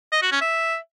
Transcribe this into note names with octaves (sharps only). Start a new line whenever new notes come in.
D#5
F#4
C#4
E5